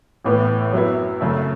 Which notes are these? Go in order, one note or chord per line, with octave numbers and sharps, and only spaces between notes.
A1 A2 E3 B3
F#2 F#3 B3 E4
F#2 C#3 A3